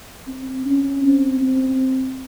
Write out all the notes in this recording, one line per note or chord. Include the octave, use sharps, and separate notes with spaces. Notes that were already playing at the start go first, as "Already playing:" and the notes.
C4
C#4
C4
C4